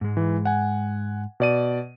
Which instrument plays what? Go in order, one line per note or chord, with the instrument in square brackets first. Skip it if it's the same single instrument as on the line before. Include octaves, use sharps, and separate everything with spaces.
[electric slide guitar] G#2 G#3
[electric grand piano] E3
F#5 G#5
B2 D5 D#7